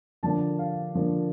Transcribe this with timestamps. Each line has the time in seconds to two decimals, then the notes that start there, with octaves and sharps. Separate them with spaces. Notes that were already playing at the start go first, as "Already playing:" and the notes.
0.23 D3 F3 A#3 D4 A5
0.59 F5
0.94 D3 F3 A#3 D4